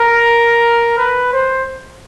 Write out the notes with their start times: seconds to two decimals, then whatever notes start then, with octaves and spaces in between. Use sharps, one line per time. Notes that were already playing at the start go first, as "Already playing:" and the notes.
Already playing: A#4
0.98 B4
1.33 C5